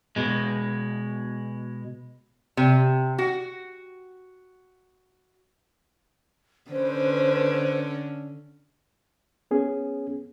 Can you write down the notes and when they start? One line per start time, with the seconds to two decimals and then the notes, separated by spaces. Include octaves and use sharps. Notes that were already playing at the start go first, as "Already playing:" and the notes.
0.16 B2 G#3
2.57 C3
3.18 F#4
6.71 D3 C#4 B4 C5
9.51 B3 C#4 G#4